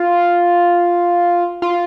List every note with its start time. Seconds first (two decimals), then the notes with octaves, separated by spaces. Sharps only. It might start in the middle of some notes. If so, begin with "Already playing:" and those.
Already playing: F4
1.62 F4